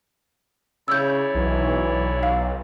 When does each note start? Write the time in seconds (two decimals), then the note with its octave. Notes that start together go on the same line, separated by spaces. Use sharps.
0.88 C#3 E4 C#5 D5 E6 G6
1.35 B1 E3
2.23 F5